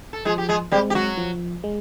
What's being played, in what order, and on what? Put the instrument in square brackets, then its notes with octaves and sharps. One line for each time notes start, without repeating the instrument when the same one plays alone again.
[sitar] A4
[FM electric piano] F3 [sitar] G#3 G#4
[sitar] G4
G#3 G#4
[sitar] G3 G4 [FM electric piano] G#3 C4
[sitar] G4
F#3 F#4
[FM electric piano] F3
G#3